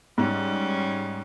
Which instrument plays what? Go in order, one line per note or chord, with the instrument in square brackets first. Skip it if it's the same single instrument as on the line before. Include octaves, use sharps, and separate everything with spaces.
[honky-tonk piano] G#2 [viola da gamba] G3 C#4